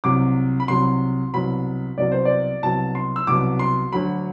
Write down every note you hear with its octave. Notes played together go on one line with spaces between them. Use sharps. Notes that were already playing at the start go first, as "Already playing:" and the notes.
C2 C3 F#3 D6
B5
C2 C3 F#3 C6
C2 B2 F#3 B5
C2 B2 F#3 D5
C5
D5
C2 B2 F#3 A5
C6
E6
C2 B2 F#3 D6
C6
D2 D3 F#3 B5